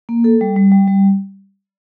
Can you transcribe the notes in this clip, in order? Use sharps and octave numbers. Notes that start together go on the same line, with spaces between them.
A#3
A4
G3
G3
G3
G3